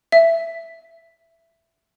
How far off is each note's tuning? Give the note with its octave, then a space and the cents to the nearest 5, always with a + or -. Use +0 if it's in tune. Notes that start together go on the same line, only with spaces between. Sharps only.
E5 +10